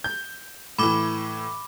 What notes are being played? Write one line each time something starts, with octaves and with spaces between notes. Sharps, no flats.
G6
A2 E3 B5 D6